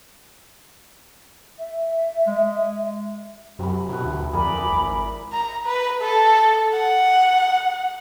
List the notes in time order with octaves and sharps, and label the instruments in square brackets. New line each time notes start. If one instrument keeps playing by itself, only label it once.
[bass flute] E5
[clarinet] G#3
[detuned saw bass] F#2 [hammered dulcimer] C3 B5
[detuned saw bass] B2 [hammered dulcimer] E4 B4
[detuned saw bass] D2
[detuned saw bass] F2 [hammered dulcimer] G#4 A#4 D5 [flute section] B5 D6
[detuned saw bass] D2
G#1
[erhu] A#5
B4
A4
F#5